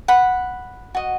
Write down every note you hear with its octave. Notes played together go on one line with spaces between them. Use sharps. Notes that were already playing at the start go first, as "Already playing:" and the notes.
F#5 B5
F#4 D#5